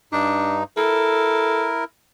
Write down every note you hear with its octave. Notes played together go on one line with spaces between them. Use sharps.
G2 D4 D#4
E4 A4 A#4